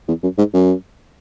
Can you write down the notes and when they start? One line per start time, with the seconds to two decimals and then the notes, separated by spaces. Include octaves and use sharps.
0.08 E2
0.23 F#2
0.38 G#2
0.54 F#2